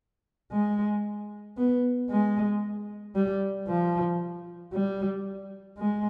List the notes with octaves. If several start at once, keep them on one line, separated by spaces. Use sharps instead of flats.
G#3
B3
G#3
G3
F3
G3
G#3